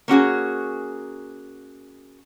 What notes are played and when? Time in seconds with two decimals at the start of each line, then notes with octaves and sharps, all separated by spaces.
0.08 A#3 C#4 F#4 G#4